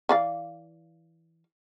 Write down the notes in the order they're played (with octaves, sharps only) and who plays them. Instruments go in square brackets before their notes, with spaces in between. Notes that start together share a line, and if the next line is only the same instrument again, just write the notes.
[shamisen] E3 D5 F5